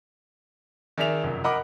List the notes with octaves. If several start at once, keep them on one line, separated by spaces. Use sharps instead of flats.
D#3 G#4 D5 E5 F7
F1 F#2
A#4 D#5 F#5 B5 D6